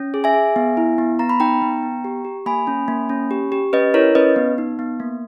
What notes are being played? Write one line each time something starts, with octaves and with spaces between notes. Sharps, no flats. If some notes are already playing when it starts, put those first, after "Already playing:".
Already playing: C#4
G#4
E5 G#5
G#4
B3
E4
B3
B3 A#5
B5
D#4 G5 A#5
B3
B3
G4
G4
A#3 G#5 B5
C#4
A#3
C#4
G4
G4
C#4 B4 D#5
E4 A#4 C#5
C#4 B4 D#5
B3
D#4
B3
A#3